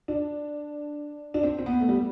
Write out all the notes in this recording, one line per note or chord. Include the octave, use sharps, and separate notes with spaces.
D4
D4
C4
C4
B3
A3
G3